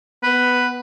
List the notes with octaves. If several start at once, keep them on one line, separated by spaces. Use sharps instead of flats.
B3 B4